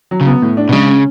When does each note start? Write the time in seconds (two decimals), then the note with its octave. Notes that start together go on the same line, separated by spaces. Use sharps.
0.11 F#3
0.21 C#3
0.26 B3
0.42 A2
0.57 D4
0.69 B2
0.72 C#3 G#3
0.88 C#4